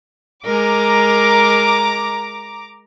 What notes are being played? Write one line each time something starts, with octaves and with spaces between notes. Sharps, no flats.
G#3 A#4 A#5 D6